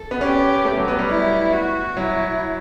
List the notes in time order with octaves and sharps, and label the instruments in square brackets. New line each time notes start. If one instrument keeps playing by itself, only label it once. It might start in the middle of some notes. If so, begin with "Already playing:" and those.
Already playing: [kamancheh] A4
[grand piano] B3
[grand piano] C#4 [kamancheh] G4
[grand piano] A3
F#3
B3
G3
[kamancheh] E4
F#4
[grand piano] F#3 [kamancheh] E4